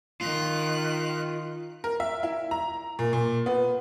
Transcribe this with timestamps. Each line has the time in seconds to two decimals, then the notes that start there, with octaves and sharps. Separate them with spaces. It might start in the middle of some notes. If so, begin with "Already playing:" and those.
0.21 D#3 F4 F#6
1.84 A#4
2.00 E5
2.23 E4
2.51 A#5
2.99 A#2
3.13 A#2
3.46 B3